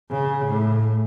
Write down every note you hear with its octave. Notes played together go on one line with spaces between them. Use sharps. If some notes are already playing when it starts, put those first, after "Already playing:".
C#3
A2